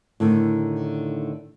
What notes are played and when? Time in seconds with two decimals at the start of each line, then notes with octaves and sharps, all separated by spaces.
0.20 A2 D3 D#3